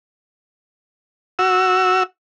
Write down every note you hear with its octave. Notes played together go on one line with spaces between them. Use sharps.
F#4 E6